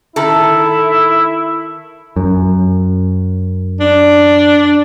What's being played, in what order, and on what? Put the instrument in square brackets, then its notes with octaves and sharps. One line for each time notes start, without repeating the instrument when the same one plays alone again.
[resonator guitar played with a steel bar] D#3 A4 [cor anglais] E4
[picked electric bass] F#2
[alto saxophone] D4